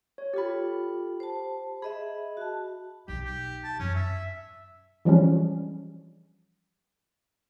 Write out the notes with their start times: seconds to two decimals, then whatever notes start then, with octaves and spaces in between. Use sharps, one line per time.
0.18 C#5
0.34 F4 G4 A4 B5
1.20 C5 A5
1.82 G#4 D#5 E5 B5
2.37 F#4 A5
3.08 B1 D#4 G4
3.25 G4
3.64 A5
3.80 F#2 C#4
3.95 E5
5.05 E3 F3 G3 G#3 C#4 D4